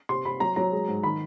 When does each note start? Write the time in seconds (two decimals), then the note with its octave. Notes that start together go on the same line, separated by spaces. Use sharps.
0.09 C3 C6
0.25 C3 B5
0.40 F#3 A#5
0.56 F#3 A#5
0.72 G#3
0.88 G#2
1.04 D#3 B5